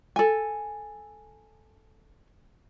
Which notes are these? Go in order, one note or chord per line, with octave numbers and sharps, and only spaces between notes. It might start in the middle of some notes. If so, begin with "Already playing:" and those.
A4 G#5